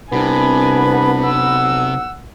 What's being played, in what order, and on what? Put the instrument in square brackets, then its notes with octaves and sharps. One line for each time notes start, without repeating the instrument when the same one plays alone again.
[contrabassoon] C2 [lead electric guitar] C3 [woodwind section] B3 D4 B5 [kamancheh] G#5
[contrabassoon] B1 [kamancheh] F#5 E6